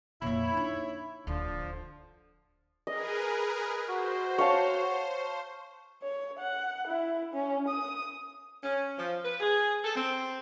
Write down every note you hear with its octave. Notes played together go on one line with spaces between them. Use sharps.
F2 A#2 E4 C#5
D4 D#4
D1 D3 F3
G#4 A#4 B4 D#5
F#4 C5
C#5 F5 A5
C#5
F#5
E4
C#4
D#6
C#4
F3
B4
G#4
A4
C4